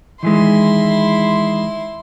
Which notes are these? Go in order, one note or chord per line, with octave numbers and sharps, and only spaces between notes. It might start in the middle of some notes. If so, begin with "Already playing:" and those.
D#3 E3 G#3 E4 C6